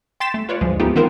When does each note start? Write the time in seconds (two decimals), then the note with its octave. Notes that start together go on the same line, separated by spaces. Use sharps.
0.20 G5 C6 A6 B6 E7
0.34 A3
0.49 F4 B4 C#5 D5
0.61 D2 G#2 F3 G#3
0.80 G#3 A3 B3 D#4 F4 G4
0.95 D#3 B3 C4 F4 A#4 C5